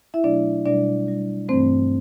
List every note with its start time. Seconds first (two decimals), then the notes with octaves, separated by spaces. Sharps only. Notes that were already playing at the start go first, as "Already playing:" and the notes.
0.14 E4 E5
0.24 B2 F#3 A3 D4 D5
0.66 B2 G3 D4 D5
1.07 B2 G3
1.49 G2 E3 A3 C4 C5